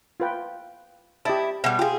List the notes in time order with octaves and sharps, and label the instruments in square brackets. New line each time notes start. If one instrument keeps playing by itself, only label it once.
[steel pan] F4 B4 G5
[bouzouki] E4 [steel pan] G4 D#5 A5
[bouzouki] B2 G3 [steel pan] E5
[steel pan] F4 [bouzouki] G4 G#4